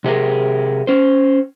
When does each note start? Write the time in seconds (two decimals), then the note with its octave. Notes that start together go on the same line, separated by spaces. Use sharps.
0.04 C3 G4 G#4 A#4
0.87 C#4 C5